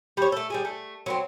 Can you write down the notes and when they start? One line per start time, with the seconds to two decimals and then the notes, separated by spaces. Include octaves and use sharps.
0.17 G3 C#5
0.32 A3 A4
0.50 G3 G#3 G#4
0.65 A3
1.06 F#3 B3 C4